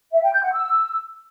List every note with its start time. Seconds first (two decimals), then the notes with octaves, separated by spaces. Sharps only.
0.13 E5
0.24 G5
0.34 G6
0.44 F#5
0.54 E6